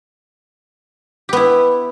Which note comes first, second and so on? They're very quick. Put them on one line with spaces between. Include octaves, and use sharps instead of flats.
G4 B3 E4